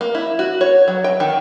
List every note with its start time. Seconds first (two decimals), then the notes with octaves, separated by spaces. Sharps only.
0.01 A#3
0.15 E4
0.39 F#4
0.61 C#5
0.88 F#3
1.04 G5
1.20 D#3